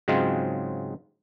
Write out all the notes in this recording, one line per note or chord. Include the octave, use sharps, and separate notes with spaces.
G#2 C#3 F#3 G#3 C4 F4